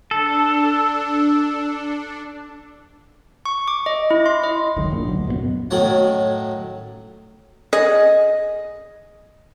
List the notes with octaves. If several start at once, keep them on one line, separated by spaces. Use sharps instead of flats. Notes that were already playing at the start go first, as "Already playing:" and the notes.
D4 A4
C#6
D6
D#5
E4
C6
D#5
F#1 C#2 F#2 D#3
A#1 A#2
D2 F#3
F#2 B2 G3 B3
F#2 A2 D#3 F#3 C#5 F#5
G#4 D#5